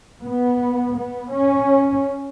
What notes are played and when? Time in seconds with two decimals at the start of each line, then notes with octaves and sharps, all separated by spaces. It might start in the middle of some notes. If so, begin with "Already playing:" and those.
0.23 B3
0.95 B3
1.32 C#4